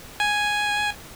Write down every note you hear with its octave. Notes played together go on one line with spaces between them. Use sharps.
G#5